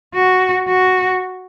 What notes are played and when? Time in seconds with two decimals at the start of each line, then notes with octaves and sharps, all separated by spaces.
0.14 F#4
0.68 F#4